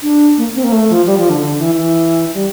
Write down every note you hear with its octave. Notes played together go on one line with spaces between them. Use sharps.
D4
A#3
C4
A#3
A3
F3
G3
F3
D3
D3
E3
E3
G3